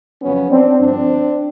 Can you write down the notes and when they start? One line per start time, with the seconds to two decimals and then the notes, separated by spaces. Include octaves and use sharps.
0.22 F2 C#3 F#3 B3 C#4
0.51 C4 D4
0.79 G2 D3 F3 C4 D4